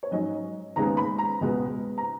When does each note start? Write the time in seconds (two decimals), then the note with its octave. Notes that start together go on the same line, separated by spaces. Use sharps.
0.03 C#5
0.11 G#2 F#3 C#4 D#5
0.76 D#2 C#3 G#3 B3 A#5
0.97 B5
1.19 A#5
1.41 C#2 B2 G#3 B3
1.98 A#5